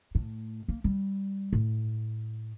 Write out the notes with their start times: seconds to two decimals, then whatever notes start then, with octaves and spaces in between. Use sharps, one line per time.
0.15 A2
0.68 A#3
0.84 G3
1.53 A2